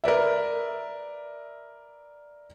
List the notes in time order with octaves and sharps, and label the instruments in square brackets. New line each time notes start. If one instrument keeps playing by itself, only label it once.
[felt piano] A#4 B4 D5 E5